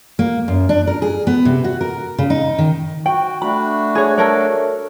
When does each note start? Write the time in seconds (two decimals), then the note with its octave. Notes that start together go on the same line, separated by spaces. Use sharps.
0.19 A#3
0.48 F#2
0.69 D4
0.87 A#4
1.02 G#4
1.27 B3
1.45 C3
1.64 F#4
1.81 A#4
2.18 C#3
2.30 D#4
2.58 D#3
3.06 F#4 G5
3.42 A3 D4 F#4 B5
3.95 G#4 C#5
4.18 A4 A#4 C#5